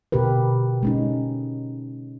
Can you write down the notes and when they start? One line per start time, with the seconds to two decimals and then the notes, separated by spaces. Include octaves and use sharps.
0.12 B2 D3 G4 A#4 B4
0.83 G#3 C#4 D#4